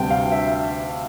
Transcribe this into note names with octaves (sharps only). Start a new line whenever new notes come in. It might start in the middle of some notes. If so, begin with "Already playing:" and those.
Already playing: D2 C3 G3 G5
F5
E5